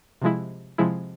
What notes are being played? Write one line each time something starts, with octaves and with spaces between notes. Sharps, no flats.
C3 F3 G#3 E4
C3 F3 G#3 E4